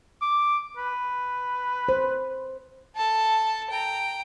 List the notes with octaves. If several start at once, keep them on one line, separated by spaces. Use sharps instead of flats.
D6
B4
C5
A4 A5
G5 A#5